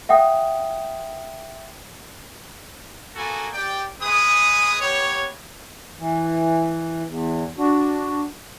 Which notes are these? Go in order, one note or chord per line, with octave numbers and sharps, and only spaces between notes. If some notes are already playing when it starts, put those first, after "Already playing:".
E5 F#5 G5 D#6
A#3 B3 F#4 A4 G#5
G4 D5 G5
G#3 G#4 B4 D#6
B3 G4 C#5
E3
E2
D4 F#4